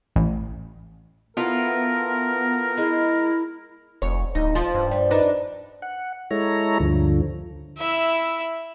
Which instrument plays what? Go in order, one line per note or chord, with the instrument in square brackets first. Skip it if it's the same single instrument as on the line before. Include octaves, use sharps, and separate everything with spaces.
[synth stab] A1
[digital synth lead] B3 [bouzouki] E4 F4 A4 [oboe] A#4
[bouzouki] G#3 [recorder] E4
[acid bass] F1 [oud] C#5
[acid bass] D1 [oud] D#4
[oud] F3 F4
[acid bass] G2
[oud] G3
D4 D#4 B4
[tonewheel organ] F#5
G#3 E4 A4 C#5 A#5
D2 G2 D3 F3
[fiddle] E4 E5